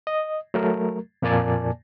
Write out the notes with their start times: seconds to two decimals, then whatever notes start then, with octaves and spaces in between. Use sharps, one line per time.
0.07 D#5
0.54 F#3 A3 A#4
1.22 F2 A#2 A#3 D5 G#5 A5